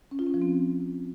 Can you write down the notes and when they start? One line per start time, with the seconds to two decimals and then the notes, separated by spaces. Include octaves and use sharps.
0.11 C#4
0.19 F4
0.26 C#4
0.34 F3
0.42 C4